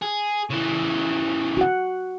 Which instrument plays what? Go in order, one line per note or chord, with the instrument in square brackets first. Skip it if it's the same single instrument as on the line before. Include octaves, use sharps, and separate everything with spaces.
[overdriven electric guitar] G#4
C#3 E3
[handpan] F#4 F#5